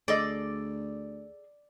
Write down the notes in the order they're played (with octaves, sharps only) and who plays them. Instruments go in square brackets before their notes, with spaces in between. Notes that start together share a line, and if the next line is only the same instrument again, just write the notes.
[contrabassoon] D2 [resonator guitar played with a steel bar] G#4 A4 D#5 [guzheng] D5